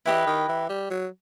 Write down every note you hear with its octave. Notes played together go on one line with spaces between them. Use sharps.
E3 E4 G4 B4 D#5
D#3
E3
G3
F#3